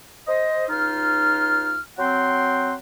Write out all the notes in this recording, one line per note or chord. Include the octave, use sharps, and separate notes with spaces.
C5 D#5
C#2 D#4 F4 F6
F#3 C4 F#5 G5 C6